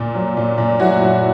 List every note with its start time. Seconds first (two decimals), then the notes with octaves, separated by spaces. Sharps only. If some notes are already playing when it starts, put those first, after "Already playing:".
Already playing: A#2
0.15 F#3
0.37 A#2
0.58 A#2
0.79 F#3 E4 F#4
1.01 F#3